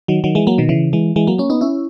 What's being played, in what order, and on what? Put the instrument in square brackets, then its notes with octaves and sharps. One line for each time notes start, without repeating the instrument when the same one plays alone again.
[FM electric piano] D#3 F#3
D#3 F#3
E3 G#3
F#3 A#3
B2 D#3
C#3 E3
E3 G#3
E3 G#3
F#3 A#3
A#3 C#4
B3 D#4
C#4 E4